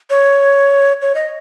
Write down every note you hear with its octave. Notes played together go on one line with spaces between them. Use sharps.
C#5
C#5
D#5